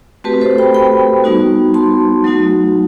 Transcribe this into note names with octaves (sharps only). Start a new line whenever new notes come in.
A3 C4 F#4 G4 B4
A4 C5
G5 B5
G5 B5
G3 B3 D#4 F#4
A5 C6
F#3 A3 D#4 F#4